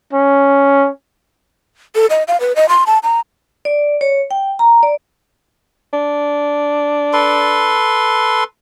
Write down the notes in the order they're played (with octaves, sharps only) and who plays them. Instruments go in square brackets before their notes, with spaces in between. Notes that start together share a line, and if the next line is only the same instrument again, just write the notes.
[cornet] C#4
[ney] A4
D#5
F5
B4
D#5
C6
A5
A#5
[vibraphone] D5
C#5
G5
A#5
D5
[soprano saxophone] D4
[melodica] A4 B4 C6